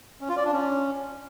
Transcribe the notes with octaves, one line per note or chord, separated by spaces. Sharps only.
C#4
F4
D5
D4
C#4